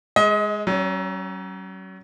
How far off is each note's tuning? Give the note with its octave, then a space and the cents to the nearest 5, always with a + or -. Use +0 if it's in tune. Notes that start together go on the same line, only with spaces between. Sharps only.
G#3 +0 D#5 +30
F#3 +35 C#4 -10